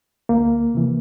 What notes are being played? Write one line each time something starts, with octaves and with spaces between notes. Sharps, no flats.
D2 A#3
C3 E3